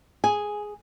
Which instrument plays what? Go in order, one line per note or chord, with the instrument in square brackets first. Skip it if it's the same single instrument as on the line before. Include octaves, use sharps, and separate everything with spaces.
[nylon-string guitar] G#4 [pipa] G#5